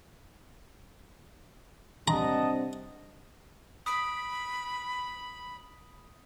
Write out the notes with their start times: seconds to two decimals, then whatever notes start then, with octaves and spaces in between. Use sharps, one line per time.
2.08 C3 G3 D4 D#5 F#5 A5 A#5
3.86 B5 D#6 B6 D7